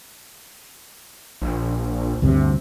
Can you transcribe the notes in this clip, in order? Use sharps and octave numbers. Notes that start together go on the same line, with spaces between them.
A#1
D2 G2 C3